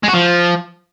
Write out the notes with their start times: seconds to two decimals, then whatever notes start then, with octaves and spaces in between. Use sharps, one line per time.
0.04 G#3
0.09 F#4
0.14 F3